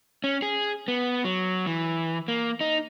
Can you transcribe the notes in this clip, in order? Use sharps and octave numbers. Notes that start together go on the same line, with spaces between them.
C#4
G#4
B3
F#3
E3
A#3
D#4